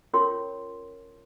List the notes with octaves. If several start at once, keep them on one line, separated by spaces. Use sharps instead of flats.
C#4 F4 A#4 C#5 C6